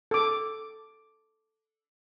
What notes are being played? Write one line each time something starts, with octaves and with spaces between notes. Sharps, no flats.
A4 D6